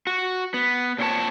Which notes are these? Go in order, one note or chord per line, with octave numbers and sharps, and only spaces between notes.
F#4
B3
A#2 C4 C#5 A5